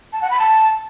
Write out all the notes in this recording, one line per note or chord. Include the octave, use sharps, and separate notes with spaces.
A5
F#5
B5
A5